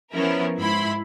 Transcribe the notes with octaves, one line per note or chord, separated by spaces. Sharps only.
F3 B3 C#4 E4 A#4
G#2 E4 B5 C6